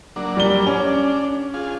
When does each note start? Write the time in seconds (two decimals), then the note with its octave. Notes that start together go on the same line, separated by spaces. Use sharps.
0.16 F#3 A#3 D4
0.37 G3 G7
0.67 C#4 D4
1.54 F4 G#4